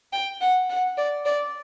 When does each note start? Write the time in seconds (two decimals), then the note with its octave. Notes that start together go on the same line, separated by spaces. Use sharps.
0.13 G5
0.41 F#5
0.70 F#5
0.98 D5
1.25 D5